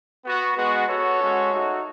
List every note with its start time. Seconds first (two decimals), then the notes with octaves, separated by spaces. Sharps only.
0.25 B3 F#4
0.56 G#3 B3 F#4
0.88 B3 F#4 A4 C#5
1.20 G#3 C#4 F#4
1.51 A3 D#4 F#4